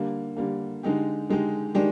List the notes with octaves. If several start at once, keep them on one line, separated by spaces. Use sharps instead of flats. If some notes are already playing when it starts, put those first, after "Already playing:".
Already playing: D3 G3 A#3
D3 G3 A#3
D3 G#3 D#4 G4
D3 G#3 D#4 G4
D#3 G#3 D4 G4